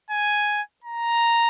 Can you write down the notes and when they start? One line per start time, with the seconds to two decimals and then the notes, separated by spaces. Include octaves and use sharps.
0.11 G#5
0.84 A#5